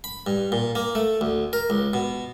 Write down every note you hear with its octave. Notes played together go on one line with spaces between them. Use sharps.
B5
G2
A#2
A#3
A3
D2
A#4
C#2
B2